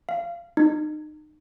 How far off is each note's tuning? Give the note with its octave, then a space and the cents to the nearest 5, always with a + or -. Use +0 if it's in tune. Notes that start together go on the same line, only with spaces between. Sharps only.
F5 -20
D#4 -30